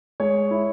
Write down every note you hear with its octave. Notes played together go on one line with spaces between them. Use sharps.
G#3 C#5
E4